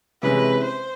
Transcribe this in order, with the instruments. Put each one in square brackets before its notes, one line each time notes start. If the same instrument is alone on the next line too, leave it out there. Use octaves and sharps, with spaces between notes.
[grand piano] C3 E3 G#3 C#4 [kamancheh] B4
[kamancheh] C5